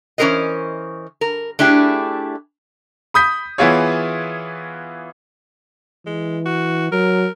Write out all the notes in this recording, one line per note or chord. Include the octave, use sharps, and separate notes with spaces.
E3 C#4 E4 A#4 C5 D#5
A#4
A3 D4 E4 G4 G#4
B5 D#6 G6 B6
E3 B3 E4 F4 G#4 C#5
E3 G#3
F#4
F#3 A#4